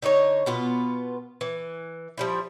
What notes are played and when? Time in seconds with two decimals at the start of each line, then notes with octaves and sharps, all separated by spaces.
0.02 D3 D#4 A4 C#5
0.46 B2 B3 F4
1.41 E3
2.17 F3 G3 E4